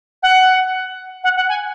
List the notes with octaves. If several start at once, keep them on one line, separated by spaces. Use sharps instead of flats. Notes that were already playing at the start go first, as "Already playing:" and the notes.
F#5
F#5
F#5
G#5